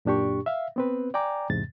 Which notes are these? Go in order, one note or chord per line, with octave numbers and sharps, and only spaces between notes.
F#2 A#2 D4 G4 C#6
E5 F5
B3 C4 B4
D5 G5 G#5 A#5 D6
E2 G#2 C3 A6